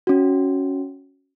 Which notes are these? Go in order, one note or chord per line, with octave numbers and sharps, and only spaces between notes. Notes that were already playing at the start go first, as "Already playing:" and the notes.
C#4 F#4